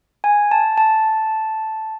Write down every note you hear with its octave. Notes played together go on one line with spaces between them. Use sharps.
G#5
A5
A5